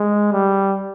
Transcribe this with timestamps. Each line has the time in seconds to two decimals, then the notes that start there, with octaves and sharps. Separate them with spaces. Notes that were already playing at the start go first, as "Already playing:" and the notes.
Already playing: G#3
0.32 G3